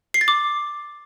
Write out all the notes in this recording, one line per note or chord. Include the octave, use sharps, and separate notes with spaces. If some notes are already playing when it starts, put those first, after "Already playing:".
C7
A6
D6